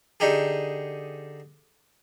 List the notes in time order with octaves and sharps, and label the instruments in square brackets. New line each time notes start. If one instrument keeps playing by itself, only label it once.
[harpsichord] D3 D#4 G4 G#4